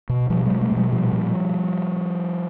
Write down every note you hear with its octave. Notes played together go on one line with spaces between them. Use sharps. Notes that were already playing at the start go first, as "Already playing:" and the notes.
B2
B2 F3 G3
F#3 G#3
B2
G3 A3
B2
F#3 G#3
A#2 F3 G3
A#2